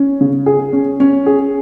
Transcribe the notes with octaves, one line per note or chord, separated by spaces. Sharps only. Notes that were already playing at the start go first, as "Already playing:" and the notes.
Already playing: C#4
C#3
G#4
C#4
C#4
G#4